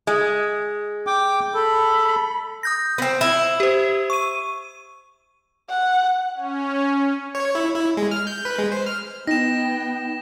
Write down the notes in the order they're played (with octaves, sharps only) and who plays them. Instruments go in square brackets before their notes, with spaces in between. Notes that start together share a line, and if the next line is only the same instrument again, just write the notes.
[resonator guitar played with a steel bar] G#3
[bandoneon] G5 D6
[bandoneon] A4 [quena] B5
[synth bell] D#6 G6 A#6
[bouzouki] B3 C4
E4
[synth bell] G4 C5
C#6 D#7
[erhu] F#5
[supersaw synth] C#4
[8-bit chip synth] C#5
E4
E4
G#3
F6
G6
B4
G#3
C5
F6
[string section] B3 G5 [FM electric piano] D#4 [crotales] A#6 E7